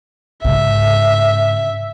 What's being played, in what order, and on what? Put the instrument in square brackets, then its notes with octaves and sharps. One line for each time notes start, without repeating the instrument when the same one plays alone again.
[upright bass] G#2 C#3 [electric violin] E5